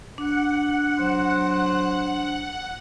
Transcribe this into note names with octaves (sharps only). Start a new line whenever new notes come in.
D4 F#5
F#3 C5